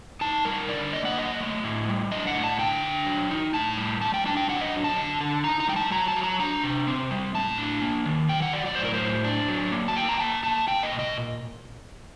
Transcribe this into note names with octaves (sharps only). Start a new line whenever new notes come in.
D#4 A5
G3 A#4
D3 D5
A#3 D#5
F#5
F#3 D#5
A3
A2
G3
D4 D#5
F#5
A2
A5
D3 G5
D4
F#3
D#4
A2 A5
G3
G3 A5
G5
D4 A5
G5
F#3 F#5
D#5
F#3
A5
D3
D3
D#4 A#5
A#5
G3 G5
A5
F#3 A#5
A5
F#3
A#5
D4 A#5
C3
C4
G3
A2 A5
D4
A#3
D#3
F#3 G5
F#5
F#3 D5
D5
A2 C5
A#4
C5
A2
D4
F#3
A#3
A5
A#3 G5
A#5
A#3 A5
A#3 A5
A#3 G5
D#5
A#2
D#5